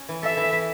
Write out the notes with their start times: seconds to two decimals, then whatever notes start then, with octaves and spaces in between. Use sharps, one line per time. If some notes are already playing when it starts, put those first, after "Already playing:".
Already playing: C#4
0.09 E3
0.23 A4 E5
0.37 E3
0.52 E3